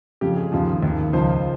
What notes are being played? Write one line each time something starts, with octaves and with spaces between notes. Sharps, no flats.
F2 C#3 F3 G4
G#4
D#2 C#3 F3
D#2 D#3
C#2 C#3 F3 C5